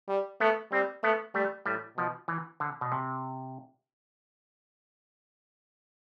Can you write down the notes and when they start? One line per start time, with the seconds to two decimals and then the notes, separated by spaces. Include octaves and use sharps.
0.08 G3
0.40 A3 B3
0.72 G3 C4
1.03 A3 B3
1.35 G3 A3
1.66 A2 G3
1.97 B2 F3
2.28 E3
2.60 D3
2.81 B2
2.92 C3